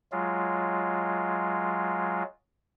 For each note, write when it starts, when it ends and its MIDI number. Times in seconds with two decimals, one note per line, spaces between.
0.12 2.23 54
0.12 2.23 56
0.12 2.23 65